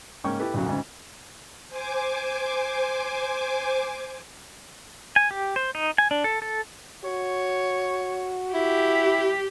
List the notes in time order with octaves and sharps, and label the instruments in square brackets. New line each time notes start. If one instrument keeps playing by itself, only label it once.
[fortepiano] G#2 C#3 A#3 C#4 G5 C#6
E4 G4 A4 B4
B1 F#2 C#3 F#3
D2 G#2 C#3
[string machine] C5 G#5 D6
[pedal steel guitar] G#5
G4
C5
D#4
G#5
D4
A4
A4
[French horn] F#4 [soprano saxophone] C#5
[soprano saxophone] E4 [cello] G4